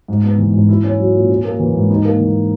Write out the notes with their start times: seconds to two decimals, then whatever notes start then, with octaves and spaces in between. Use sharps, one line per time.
0.08 G#2
0.24 B3
0.38 E3
0.54 G#2
0.69 E4
0.84 C#4
0.99 F#3
1.14 A#2
1.29 C#4
1.44 A#3
1.59 E3
1.75 G#2
1.90 D#4
2.05 A#3
2.20 E3